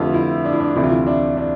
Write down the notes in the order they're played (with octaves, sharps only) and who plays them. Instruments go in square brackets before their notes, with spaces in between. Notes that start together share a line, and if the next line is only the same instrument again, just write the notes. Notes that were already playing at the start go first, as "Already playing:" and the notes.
Already playing: [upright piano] F2 D3 A3 [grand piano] F4 G4 B4
[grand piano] E4
D4
E4
D4
[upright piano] D2 C3 E3 [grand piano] E4
[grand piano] F4
E4
D4
D4